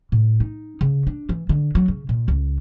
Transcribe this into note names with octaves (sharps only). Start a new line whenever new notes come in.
A2
D#4
C#3
D4
E3
D3
F#3
C#3
A#2
C#2